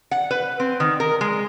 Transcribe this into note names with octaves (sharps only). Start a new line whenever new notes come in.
F#5
B4
C4
D#3
A#4
G#3